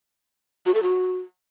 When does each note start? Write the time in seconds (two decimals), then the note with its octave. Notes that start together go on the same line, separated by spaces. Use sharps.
0.66 F#4
0.74 A4
0.83 F#4